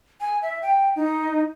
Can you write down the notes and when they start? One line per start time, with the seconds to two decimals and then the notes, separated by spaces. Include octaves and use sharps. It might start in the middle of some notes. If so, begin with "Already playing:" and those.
0.21 G#5
0.42 E5
0.62 G5
0.96 D#4